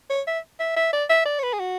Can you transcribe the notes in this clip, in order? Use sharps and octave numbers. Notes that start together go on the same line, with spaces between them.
C#5
E5
E5
E5
D5
E5
D5
C#5
B4
G#4
F#4